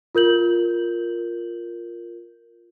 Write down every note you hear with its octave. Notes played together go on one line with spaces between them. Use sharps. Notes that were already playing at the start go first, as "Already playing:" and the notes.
F4 A#4 G6 F#7